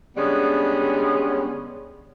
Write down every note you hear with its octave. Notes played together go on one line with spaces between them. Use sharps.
D3 G3 G#3 B3 C#4